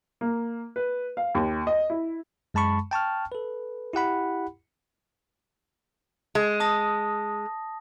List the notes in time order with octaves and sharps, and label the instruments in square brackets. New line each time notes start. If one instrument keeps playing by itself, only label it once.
[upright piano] A#3
B4
F5
D#2
D#5
E4
[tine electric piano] F#2 G#3 A5 B5 C#6
G5 A5 C#6 F6
A4 B4
E4 G4 F#5 B5
[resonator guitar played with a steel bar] G#3
[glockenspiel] A5 D#6 A#6